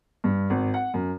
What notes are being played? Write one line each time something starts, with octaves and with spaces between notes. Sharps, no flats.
G2
G#1
F#5
F#2